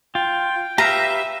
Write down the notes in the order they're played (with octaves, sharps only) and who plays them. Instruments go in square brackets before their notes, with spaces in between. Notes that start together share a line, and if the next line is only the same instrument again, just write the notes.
[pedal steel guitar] F4 [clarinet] G5
[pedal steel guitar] G4 B4 F5 [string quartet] E5 [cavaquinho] A#5